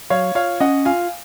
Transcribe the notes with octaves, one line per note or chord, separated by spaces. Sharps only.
F#3 C#5 F5
F4 C#5 F5
C#4 D#5 F#5
F4 F5 G#5